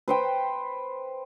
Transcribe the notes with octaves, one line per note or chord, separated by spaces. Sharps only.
B4 C5 G5